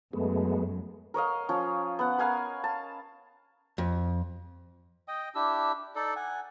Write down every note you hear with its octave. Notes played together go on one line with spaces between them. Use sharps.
F#2 G#3 A3 B3
A#4 C#5 D#5 F5
F3 C#4
B3 F#5
A#4 F5 G#5 B5
A5
F2
D#5 G5 D#6
D4 E4 G4 E6
D#4 A4 D5
F#5 G#5